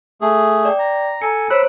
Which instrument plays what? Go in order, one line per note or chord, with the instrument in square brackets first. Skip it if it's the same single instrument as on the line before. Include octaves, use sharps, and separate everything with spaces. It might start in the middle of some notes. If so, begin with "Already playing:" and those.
[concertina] A3 G#4
[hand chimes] D5 G5
[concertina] A#5
[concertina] A4 G#5 [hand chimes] A#5 C#7
[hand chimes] C5 C#5 F#6 [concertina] B5 E6